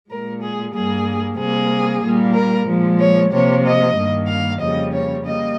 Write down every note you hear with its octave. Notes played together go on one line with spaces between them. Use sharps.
A#2 G#3 A#4
G#4
G2 G3 A#3 G#4
C3 G3 A#3 G#4
A#2 G3 A#3
A#4
A#2 F3 G#3
C#5
C3 F3 A#3 C#5
D#5
G2 D#3 A#3
F5
F2 C#3 G3 A#3 D#5
C#5
G3 A#3 D#5